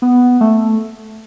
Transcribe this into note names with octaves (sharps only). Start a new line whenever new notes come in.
B3
A3